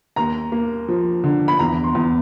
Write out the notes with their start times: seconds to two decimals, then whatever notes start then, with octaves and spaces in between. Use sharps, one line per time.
0.16 D#2 A#5
0.52 A#3
0.88 F3
1.24 D3
1.48 B5
1.59 E2 A#5
1.84 C6
1.95 E2